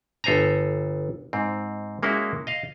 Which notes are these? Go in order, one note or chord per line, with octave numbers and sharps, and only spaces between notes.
G1 A4 C5 G#5 A#5
G#2 C4
G#3 A#3 C#4 E4 F#4
D#5 F5